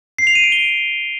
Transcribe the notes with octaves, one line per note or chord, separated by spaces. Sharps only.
C7
F7
D#7
D7
G7